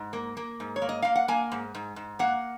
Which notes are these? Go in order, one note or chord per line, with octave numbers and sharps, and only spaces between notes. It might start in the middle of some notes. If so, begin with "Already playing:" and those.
Already playing: G#2
A#3
A#3
G#2
C#5
A#3
D#5
A#3 F5
F#5
A#3 G#5
G#2
G#2
G#2
A#3 F#5